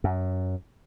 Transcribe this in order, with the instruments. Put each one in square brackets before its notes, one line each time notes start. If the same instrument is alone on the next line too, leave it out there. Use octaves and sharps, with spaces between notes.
[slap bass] F#2